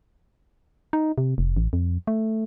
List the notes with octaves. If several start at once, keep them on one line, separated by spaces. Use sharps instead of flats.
D#4
C3
F1
A1
F2
A3